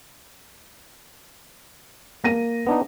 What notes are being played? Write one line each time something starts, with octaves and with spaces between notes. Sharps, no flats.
A#3 A#6 D#7
B3 D4 D#4